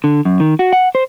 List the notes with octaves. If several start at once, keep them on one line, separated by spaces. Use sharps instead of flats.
D3
F#2
D#3
F#4
F#5
C5